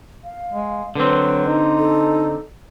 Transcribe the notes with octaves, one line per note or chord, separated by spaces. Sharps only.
F5
G#3
D3 F#3 C4 B4
D#4
A4